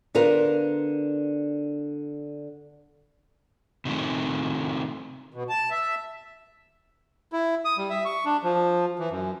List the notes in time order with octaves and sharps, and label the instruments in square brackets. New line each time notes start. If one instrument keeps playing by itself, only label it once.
[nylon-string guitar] D3 B3 F4 A#4
[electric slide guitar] C3 D#3 A3
[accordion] B2
A5
E5
[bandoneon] E4
D#6
G3
E5
C#6
D4
F3
E3
F#2